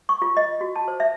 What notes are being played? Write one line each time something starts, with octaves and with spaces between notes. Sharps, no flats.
C#6
F4
D#5
F#4
A5
C5
E5